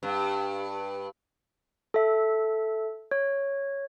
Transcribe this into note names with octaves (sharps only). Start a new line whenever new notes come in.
G2
A4 E5
C#5